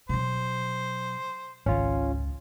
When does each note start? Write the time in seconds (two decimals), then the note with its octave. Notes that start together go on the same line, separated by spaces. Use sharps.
0.09 B2 F#3 C5
1.66 G#1 C#2 D#3 C#4 F4